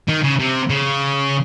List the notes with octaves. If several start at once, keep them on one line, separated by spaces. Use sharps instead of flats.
D#3
C#3
C3
C#3